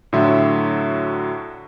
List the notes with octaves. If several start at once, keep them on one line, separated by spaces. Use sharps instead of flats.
A2 D3 F#3 E5 C6